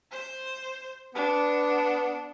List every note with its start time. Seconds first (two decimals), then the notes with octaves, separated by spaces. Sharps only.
0.11 C5
1.15 B3 D4